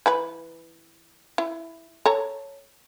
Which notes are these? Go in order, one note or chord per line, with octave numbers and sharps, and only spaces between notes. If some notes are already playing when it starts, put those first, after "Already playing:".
E3 B4 B5
E4
A4 C#5 A#5